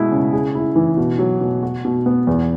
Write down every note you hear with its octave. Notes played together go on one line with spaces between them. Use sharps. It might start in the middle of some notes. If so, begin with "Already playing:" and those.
Already playing: B2 G#3 E4
C#3
G#4
E4
E3
B2
F#3
B2
F#4
B2
B3
E2